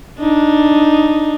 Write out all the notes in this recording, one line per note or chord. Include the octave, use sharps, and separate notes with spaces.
D4 D#4